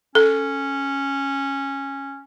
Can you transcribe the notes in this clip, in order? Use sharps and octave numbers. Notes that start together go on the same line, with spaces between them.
C#4 A4